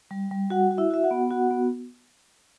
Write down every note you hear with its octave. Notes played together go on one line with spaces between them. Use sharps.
G3
G3
F#4 F#5
F#4
E4 E5
F#4 E5
F#4 F#5
B3
F#4 F#5
B3